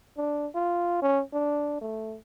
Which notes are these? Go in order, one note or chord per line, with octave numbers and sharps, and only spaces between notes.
D4
F4
C#4
D4
A3